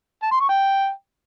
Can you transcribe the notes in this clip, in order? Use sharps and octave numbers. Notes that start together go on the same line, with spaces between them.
A5
C6
C#6
G5